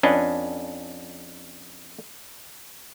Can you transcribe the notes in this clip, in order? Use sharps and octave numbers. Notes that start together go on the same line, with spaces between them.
F2 C#4 D4 B4 D#5